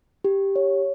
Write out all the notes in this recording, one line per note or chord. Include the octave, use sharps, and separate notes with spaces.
G4
C#5